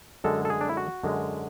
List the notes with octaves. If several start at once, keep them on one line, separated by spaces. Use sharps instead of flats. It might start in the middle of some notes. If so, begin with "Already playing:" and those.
F#2 D3 G#3 A4
A4
G#4
D4
E4
F#4
F#2 D3 G#3